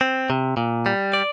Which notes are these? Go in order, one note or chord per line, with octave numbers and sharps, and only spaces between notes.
C4
C3
A#2
G3
D5